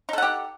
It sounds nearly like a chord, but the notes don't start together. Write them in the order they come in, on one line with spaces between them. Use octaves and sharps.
D#4 A4 F#5 G4